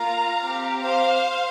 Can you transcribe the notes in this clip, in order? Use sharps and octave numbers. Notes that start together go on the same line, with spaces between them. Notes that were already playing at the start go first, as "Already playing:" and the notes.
Already playing: A#3 F4 F5 A#5
C4 G4
C5 F5